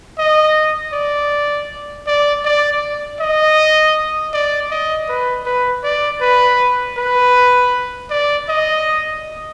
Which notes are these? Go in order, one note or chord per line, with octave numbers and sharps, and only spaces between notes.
D#5
D5
D5
D5
D#5
D5
D#5
B4
B4
D5
B4
B4
D5
D#5